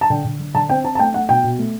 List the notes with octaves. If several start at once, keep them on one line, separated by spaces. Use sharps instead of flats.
A5
D3 G5
D3
D3
D3 A5
C4 G5
C4 A5
A5
A3 G5
A3 F#5
B2 G5
B2
A3